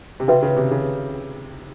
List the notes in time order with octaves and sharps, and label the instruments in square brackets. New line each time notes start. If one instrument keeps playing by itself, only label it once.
[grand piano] C3
[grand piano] C#3 [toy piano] F#4 B4 E5 G5
[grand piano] C#3
C3
C#3